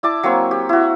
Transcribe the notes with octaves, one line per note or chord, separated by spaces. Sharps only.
E4 D5 A5 D6
F#3 A#3 C4 C#6
G4
E4 F#4